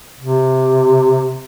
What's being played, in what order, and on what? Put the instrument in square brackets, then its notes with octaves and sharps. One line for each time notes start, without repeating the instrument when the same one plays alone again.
[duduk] C3